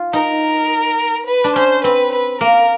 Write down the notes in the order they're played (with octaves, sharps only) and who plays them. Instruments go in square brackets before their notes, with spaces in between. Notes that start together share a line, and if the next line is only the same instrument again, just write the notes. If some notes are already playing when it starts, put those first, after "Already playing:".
Already playing: [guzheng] F4
[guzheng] D#4 [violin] A#4
[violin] B4
[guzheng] D4
[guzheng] C#4 [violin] C5
[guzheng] C4 [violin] B4
[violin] B4
[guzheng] A#3 [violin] A#4